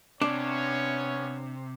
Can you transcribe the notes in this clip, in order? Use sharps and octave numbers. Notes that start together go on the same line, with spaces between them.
C3 B3 C#4 D4 C#5